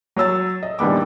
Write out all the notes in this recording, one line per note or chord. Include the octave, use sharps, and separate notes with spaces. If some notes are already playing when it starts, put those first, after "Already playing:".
F#3 C#5 E6 A6
D#5
A#1 D#3 G3 B3 D6